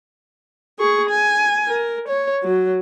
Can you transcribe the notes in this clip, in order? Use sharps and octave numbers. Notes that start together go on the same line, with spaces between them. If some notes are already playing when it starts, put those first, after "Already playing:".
G#4 C#6
G#5
A#4
C#5
F#3